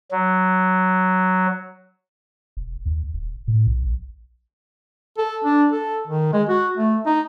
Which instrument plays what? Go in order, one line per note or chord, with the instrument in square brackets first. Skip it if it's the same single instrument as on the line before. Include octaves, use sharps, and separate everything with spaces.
[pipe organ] F#3
[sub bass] E1
D#2
D#1
A2
B1
A#1
[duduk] A4
D4
A4
D#3
G#3
F#4
A3
D#4